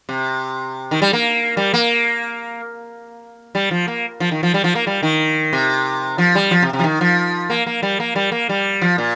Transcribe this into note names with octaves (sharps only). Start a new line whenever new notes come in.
C3
D#3
G3
A#3
G3
A#3
G3
F3
A#3
F3
D#3
F3
G3
F3
A#3
G3
D#3
C3
F3
G3
F3
C3
C3
F3
D#3
F3
A#3
A#3
G3
A#3
G3
A#3
G3
F3
A#2